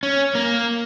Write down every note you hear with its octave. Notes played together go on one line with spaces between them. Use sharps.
C#4
A#3